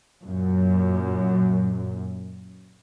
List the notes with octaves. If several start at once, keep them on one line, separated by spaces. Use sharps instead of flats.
F#2 A#2